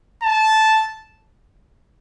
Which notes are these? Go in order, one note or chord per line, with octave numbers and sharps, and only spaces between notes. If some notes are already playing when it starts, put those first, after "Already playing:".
A5